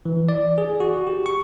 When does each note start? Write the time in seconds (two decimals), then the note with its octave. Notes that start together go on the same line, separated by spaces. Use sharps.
0.05 E3
0.29 D5
0.58 G#4
0.80 F#4
1.07 G4
1.26 C#6